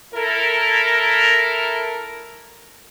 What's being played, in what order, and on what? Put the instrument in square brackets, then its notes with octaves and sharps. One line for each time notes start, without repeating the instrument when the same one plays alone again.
[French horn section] E4 A4 A#4